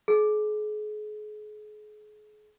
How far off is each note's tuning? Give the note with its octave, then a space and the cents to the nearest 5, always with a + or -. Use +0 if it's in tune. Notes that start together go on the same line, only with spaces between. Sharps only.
G#4 +35